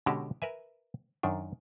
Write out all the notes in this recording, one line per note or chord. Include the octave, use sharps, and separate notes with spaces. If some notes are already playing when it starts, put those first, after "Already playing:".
B2 D3 G#3 C#4 F#4 G4
A#4 B4 E5 G#5
F#2 D#3 D4